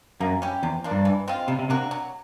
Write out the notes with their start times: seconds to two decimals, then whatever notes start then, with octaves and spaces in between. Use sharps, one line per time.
0.20 F#2 A#3
0.42 C#4 E4 G4
0.63 E2 C3
0.84 F3 A#3 D4
0.91 G2
1.05 E3
1.28 G#3 C4 F4
1.48 C3 G3
1.59 C3
1.69 C3 A#3 D4 F#4
1.91 F#3